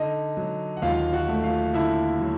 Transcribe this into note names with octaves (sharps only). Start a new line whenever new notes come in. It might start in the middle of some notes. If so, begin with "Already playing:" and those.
Already playing: D3 D#4 D#5
F#3
F#5
D#2 F4 F5
F#4 F#5
A3
F4 F5
D3 E4 E5
F#3